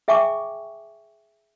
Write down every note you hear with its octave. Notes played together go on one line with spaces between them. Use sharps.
G#4 E5 G5 G#5 C#6 D6